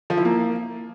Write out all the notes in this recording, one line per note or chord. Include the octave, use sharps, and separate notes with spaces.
F3
E4
A#3